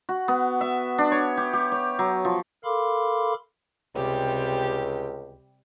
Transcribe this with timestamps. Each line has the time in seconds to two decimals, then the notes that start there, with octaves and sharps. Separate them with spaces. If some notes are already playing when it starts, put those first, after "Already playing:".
0.09 F#4
0.28 B3
0.61 E5
0.98 D4
1.12 C#5
1.37 G4
1.53 G4
1.72 C#5
1.99 F#3
2.25 F3
2.64 A4 A#4 F5 B5 C6 D6
3.95 C#2 C3 G3 G4